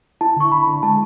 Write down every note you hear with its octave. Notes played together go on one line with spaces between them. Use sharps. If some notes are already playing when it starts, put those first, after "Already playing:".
E4 A5
D3 C#6
D3 B5
D3
G#3 A5